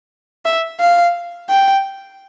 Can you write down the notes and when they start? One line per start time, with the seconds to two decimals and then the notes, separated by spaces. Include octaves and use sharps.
0.45 E5
0.80 F5
1.50 G5